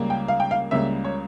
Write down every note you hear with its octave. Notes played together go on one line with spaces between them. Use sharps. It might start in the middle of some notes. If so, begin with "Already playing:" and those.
Already playing: C#2 C#3 G3 A#3
G5
F5
G5
F5
C#2 C#3 G3 A#3 E5
C#5